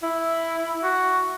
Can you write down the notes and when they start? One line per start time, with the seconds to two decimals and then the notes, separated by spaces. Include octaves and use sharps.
0.03 E4
0.83 F#4